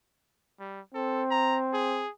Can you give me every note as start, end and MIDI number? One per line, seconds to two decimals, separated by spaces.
0.60 0.81 55
0.94 2.05 60
0.94 1.23 69
1.31 1.58 82
1.73 2.11 68